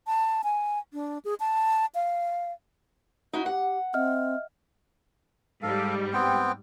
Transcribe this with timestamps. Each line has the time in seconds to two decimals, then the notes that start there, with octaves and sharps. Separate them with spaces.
0.07 A5
0.44 G#5
0.93 D4
1.25 G#4
1.40 A5
1.95 F5
3.33 D#4 E4 F#4 E5
3.46 G4 F#5
3.94 C4 D#5 E5 F6
5.62 G#2 G3 A4 F5
6.13 B3 C4 G5